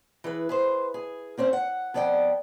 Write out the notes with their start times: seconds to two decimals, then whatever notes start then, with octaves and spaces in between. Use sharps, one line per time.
0.24 E3 G#4 B4
0.49 G#4 B4 C5
0.94 G#4
1.38 A#3 C4 C#4 C5
1.53 F#5
1.94 F2 B3 D5 F#5 G5